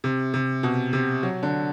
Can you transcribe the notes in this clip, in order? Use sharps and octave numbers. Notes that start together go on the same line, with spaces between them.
C3
C3
B2
C3
F#3
D3